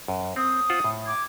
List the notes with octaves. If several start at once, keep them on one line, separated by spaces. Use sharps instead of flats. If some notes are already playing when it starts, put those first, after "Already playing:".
F#2
C4 D#6
F4 C5 F#5
A2
D6 G#6